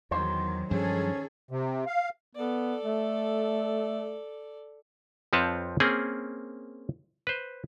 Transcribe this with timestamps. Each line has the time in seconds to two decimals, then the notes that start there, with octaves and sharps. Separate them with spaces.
0.11 E2 D#3 F#3 C5
0.71 G2 D#3 F3 F#3 C#4 G#4 A4
1.51 C3
1.86 F5
2.35 B3 A4 D5
2.84 A3
5.33 F2 F3 C4 B4 C#5 A5
5.80 A#3 C4 C#4 G#4
7.27 B4 C5